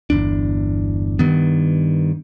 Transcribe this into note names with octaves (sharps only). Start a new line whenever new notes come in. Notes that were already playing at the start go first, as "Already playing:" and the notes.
G1 E2 D4
G2 D#3 B3